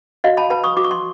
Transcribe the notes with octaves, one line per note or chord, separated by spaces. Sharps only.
F#4 D#5 F5
A5 B5
B4 A5 B5
C#6 D#6
F#4 D6
C#6
C6